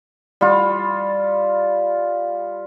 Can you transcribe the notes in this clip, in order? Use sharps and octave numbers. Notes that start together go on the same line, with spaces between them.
G3 F4